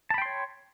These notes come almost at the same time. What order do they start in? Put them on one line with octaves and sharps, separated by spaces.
A5 B5 G5 C6 C#5